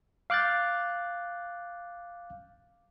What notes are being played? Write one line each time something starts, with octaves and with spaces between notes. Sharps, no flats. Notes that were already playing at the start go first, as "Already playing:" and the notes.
F5 D6 F#6 G6 A6